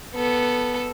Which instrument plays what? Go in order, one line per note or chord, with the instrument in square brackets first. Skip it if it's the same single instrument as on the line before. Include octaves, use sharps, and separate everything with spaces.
[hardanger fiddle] B3 A4